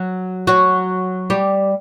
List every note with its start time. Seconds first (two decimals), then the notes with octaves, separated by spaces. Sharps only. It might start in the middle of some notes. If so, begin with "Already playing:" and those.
Already playing: F#3
0.47 F#3 F#4
1.30 G3 G4